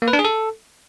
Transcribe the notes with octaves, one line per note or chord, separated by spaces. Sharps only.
A#3
B4
D4
G#4
A4